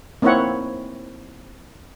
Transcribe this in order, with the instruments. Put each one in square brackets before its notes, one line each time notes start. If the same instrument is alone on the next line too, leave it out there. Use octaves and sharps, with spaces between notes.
[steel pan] A#3 C4 D#4 E4 C#5 F#5